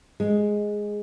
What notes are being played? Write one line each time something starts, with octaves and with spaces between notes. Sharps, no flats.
G#3